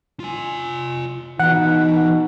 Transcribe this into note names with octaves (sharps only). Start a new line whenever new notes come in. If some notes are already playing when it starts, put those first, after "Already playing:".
F4 G#5
B2 E3 D#4 F#5